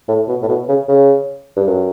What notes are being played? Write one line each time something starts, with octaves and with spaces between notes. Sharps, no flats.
A2
B2
A2
B2
C#3
C#3
G2
F#2